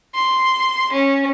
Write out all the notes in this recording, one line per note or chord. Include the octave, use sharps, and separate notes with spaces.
C6
C#4